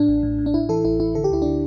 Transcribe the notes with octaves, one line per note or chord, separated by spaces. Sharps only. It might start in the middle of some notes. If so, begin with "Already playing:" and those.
Already playing: A2 D4
A1
A2
A2
D4
A2 E4
E3 E4 A4
A1 E4
A1 E4
D3 A4
G4
D2 E4
D3 D4 G4